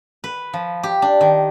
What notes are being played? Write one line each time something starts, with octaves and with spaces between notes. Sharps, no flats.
B4
F3
G4
D4
D#3